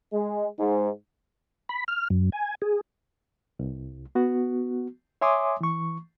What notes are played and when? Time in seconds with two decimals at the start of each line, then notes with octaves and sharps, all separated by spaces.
0.13 G#3
0.58 G#2
1.69 B5
1.88 F6
2.10 F#2
2.32 G#5
2.62 G#4
3.59 C2
4.15 B3 F#4
5.21 C#5 E5 G#5 C6 D6 D#6
5.61 E3 C#6